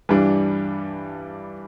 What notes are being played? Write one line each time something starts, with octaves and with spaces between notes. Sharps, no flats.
G2 E3 G3 D4